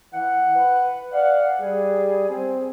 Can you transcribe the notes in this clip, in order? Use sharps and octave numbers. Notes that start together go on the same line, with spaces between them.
E3 F#5
B4
D5 F5 F#5
G3 G#4
C4